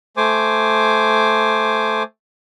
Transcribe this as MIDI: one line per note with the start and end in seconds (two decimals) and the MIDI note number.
0.17 2.03 57
0.17 2.03 72
0.17 2.03 80
0.17 2.03 86